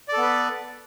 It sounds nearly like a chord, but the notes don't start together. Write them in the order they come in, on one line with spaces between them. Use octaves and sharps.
D5 A4 B3 B4